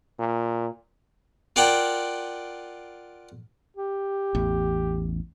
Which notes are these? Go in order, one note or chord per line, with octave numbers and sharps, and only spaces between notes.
A#2
F4 A#4 D5 F#5 G5 A5
G4
A1 E2